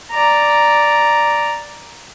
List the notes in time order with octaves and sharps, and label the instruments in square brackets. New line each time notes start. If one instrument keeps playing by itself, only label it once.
[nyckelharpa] D5 A#5